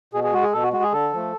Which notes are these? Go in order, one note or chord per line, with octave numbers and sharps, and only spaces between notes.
B2 G#4
G#4
G#3 F#4
G#4
B2 A4
F#4
G#3 F#4
G#4
D3 A4
F3 A3